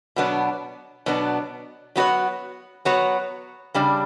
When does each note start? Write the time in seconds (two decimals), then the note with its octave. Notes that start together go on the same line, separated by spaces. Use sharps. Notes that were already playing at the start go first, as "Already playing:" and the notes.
0.16 B2 F#3 B3 D4
1.06 B2 F#3 B3 D4
1.96 F#3 B3 F#4 C#5
2.85 F#3 B3 F#4 C#5
3.74 C#3 G3 D4